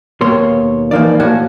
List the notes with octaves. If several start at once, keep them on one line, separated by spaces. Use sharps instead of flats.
D#2 B2 A#3 C#5 C6
E3 F3 A#3 D#4 D5
A2 A#3 F#4 F#5 G#5